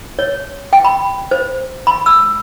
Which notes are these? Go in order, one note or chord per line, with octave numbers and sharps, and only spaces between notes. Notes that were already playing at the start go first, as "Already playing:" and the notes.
C#5
G5
B5
C5
B5
E6